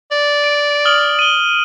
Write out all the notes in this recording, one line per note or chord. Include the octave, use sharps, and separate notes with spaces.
D5
D7
D#6 F6 F#7
D#7 G7